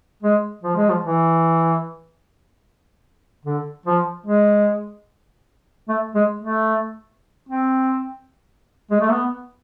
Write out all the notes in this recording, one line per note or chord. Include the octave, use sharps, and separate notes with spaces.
G#3
F3
G#3
F3
E3
D3
F3
G#3
A3
G#3
A3
C4
G#3
A3
B3